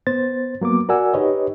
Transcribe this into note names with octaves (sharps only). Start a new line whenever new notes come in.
B3 C5 A6
F#3 A#3 B3 D6
F#4 A#4 D5 F#5 G#5 E6
D#4 G4 B4 C#5 D#5